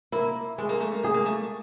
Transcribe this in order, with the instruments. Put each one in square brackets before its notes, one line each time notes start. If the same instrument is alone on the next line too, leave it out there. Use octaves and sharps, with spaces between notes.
[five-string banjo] A#3 [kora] E4
[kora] G#3 [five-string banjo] A3
[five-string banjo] A#3
A3
A#3
[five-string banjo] A3 [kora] G#4
[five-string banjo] A#3
A3